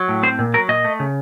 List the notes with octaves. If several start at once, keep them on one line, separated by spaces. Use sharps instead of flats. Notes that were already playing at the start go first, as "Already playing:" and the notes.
Already playing: F#3
A2
C4 C5
A#2
F#3 A#4
A#2 D#5
A3
C#3